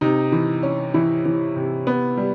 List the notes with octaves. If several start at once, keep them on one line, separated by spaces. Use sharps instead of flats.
C3 D#4
E3
C#4
E3 E4
E3
C3
B3
G3